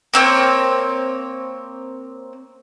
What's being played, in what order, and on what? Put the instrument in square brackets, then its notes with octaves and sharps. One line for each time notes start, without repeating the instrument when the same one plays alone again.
[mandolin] A#3 C4 C#5